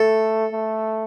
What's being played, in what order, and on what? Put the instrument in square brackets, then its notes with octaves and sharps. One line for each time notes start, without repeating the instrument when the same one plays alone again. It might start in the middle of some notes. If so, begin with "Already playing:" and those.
Already playing: [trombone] A3 [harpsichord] A4
[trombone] A3